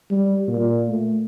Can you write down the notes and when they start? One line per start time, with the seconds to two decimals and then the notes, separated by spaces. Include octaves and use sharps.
0.11 G3
0.48 A#2
0.89 A3